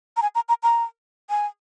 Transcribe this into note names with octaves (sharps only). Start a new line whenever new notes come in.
A#5
G#5
A#5
A#5
A#5
G#5